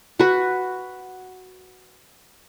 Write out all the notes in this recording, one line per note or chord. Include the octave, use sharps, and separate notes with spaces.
F#4 B4